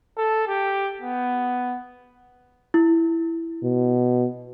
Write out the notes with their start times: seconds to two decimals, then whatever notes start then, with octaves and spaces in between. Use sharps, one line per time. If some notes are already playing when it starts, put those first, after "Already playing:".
0.17 A4
0.48 G4
1.01 B3
2.74 E4
3.64 B2